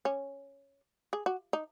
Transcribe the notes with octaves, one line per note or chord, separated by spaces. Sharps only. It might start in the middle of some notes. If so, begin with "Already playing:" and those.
C#4
G#4
F#4
D#4